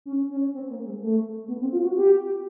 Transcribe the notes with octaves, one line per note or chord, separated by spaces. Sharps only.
C#4
C#4
C4
A#3
G#3
A3
B3
C4
F4
F#4
G4